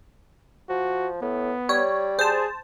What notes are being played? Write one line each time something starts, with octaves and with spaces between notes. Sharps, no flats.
F3 F#4
A2 B3
G3 C#5
G#4 C5 A5